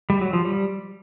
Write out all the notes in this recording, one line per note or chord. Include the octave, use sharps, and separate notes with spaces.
G3
F#3
F3
G3